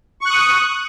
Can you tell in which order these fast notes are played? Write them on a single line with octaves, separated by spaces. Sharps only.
C#6 F#6 D#6